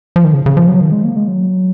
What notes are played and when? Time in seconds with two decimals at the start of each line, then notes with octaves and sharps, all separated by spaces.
0.16 F3
0.24 D#3
0.33 C#3
0.46 C#3
0.57 F3
0.69 F#3
0.81 D#3
0.92 G#3
1.04 A#3
1.16 G#3
1.28 F#3